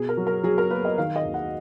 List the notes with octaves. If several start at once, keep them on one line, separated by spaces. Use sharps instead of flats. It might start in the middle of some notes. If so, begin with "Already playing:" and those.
Already playing: B2 G#4
A#4
F#3
A#4
F#3 G#4
A#4
A#3 B4
D#5
D#3 F5
D#5
D#2
F#5